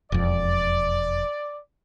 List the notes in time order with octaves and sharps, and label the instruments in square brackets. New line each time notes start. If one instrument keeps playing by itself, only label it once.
[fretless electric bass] E1 F2 [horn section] D5